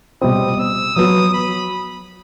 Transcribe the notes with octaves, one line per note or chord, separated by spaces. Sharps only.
B2 G3 C4 D#6
E6
F#3 B3 F#4 D#6
B5